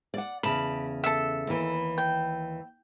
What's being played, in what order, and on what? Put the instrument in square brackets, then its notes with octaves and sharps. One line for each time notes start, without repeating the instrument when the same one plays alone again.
[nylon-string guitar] D5 F#5
[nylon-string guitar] E2 C#3 A5 [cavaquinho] B5
[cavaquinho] A4 E5
[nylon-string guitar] D#2 E3
[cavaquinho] G5